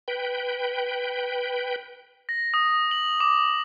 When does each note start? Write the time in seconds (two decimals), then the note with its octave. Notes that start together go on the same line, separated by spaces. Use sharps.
0.08 B4 G5
2.29 A#6
2.54 D#6
2.91 F#7
3.20 D6